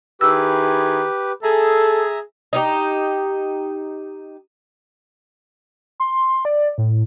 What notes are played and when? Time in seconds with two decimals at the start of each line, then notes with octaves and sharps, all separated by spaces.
0.21 D#3 E4 G4 G#4 B4 E6
1.43 G#4 A4 E5 A#5
2.53 D#4 E4 G4
6.00 C6
6.45 D5
6.78 A2